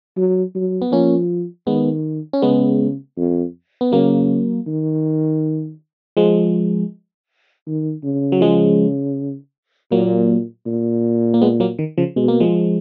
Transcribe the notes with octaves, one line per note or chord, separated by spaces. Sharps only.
F#3
F#3
B3
F3 A#3 C#4
D#3 G#3 B3
C#4
C#3 G#3 B3
F2
B3
C#3 F#3 A#3
D#3
F3 G#3
D#3
C#3
F#3
F3 G#3
A#2 F#3 A#3
A#2
A#3
G#3 B3
F#3 A#3
D#3
C#3 F3
B2 G#3
A#3
F3 G#3